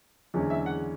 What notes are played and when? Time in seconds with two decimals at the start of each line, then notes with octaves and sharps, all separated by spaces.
0.34 F#1 E2 D3 G#3 C#4
0.50 E5
0.66 F#5